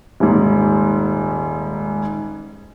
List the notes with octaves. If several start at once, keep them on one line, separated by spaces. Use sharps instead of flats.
D#1 G#2